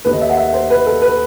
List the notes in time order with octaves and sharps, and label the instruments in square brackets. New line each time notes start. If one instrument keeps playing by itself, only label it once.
[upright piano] D#2 D#3 A3 B4
D#5
E5
F#5
E5
C5
B4
A4
B4